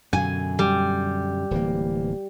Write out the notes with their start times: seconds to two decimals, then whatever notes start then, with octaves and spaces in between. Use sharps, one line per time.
0.13 F#2 B2 D3 G#5
0.59 G3
1.51 D1 E3 A#3